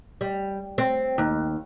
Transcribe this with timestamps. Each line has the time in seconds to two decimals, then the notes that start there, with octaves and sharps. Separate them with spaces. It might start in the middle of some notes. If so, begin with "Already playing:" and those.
0.21 G3
0.78 C4
1.18 D#2